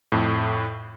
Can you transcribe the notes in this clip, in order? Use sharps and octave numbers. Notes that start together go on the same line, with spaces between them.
F2 A2